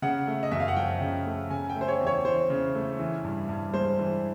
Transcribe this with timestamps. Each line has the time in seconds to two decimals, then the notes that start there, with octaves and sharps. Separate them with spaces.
0.02 C#3 F#5
0.27 A3
0.43 D#5
0.51 F#2 E5
0.60 F5
0.68 F#5
0.76 F3 G5
1.01 C#3
1.26 A3
1.51 C#3 G#5
1.70 G5
1.76 A3
1.81 C5
1.88 C#5
2.01 E2
2.07 C#5
2.25 E3 C5
2.50 C#3
2.75 A3
2.99 E3
3.24 G2
3.49 G2
3.74 G#3 C5
3.99 E3